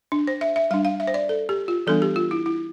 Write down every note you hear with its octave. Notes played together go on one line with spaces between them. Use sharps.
D4
C5
E5
E5
G3 D4 F5
F5
E5
C5
D5
A4
G4
F4
E3 G3 B3 D4 A4
G4
F4
E4
E4